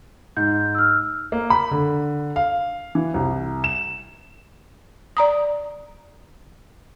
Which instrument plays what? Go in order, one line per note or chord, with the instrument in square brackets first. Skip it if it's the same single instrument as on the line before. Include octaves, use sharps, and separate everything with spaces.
[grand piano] G#2 [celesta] G6
[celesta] E6 F6
[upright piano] A#3
B5
D3
F5
E3
C2
E7
[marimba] D5 A#5 D#6